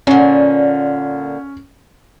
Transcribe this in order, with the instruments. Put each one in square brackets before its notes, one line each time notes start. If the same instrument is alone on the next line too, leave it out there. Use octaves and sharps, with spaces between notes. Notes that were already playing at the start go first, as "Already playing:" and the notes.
[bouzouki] A#2 D3 [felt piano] C#4